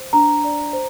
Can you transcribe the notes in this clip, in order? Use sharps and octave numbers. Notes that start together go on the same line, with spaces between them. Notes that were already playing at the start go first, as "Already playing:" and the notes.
Already playing: C5
D4 A#5
D5
C5